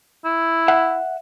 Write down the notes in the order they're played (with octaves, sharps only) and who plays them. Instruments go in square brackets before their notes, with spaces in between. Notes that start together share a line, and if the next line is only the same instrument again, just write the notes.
[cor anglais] E4
[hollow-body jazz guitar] E5 F#5